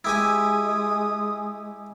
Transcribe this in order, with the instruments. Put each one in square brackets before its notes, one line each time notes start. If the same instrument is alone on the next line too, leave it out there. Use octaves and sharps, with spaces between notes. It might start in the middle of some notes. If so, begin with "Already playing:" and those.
[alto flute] G#3 [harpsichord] E4 G4 G#5 [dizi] D#6